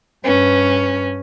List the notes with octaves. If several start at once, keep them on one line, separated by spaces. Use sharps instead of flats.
G2 C#4 B4